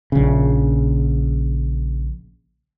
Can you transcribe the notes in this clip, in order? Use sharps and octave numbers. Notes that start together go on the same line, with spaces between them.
A#1 C#3